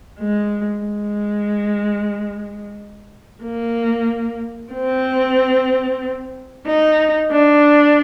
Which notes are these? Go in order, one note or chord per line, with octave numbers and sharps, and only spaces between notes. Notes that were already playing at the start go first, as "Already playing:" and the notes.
G#3
G#3
A#3
C4
D#4
D4